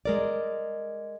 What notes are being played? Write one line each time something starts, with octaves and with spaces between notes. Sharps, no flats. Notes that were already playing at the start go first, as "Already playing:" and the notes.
G#3 A#4 D5